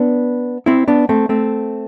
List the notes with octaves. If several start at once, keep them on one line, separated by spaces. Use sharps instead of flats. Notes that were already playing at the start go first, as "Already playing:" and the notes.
Already playing: B3 D4
C4 E4
B3 D4
A3 C4
A3 C4